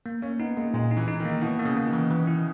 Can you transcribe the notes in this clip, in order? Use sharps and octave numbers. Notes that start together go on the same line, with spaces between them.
A#3
A#3 C#4
B3 D#4
G#3 A#3
A#2 G#3
D#4
E3
D#4
D#3
A#3
B2 E4
A#3
C#3
A#3
D#3
E3
E3
E4